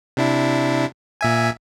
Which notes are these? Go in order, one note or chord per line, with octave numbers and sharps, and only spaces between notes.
C3 D4 E4
A#2 E5 G#5